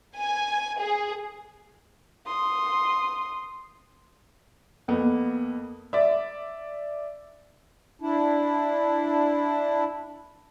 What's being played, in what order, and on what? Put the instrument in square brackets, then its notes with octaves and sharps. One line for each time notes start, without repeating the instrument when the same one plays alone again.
[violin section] G#5
G#4
[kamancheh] C6 D#6
[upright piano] F2 A#3 B3
D5 E5
[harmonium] D4 E4